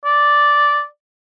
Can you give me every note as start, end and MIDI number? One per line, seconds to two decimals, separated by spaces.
0.05 0.84 74